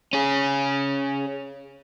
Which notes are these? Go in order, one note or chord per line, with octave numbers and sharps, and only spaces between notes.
C#4 G#4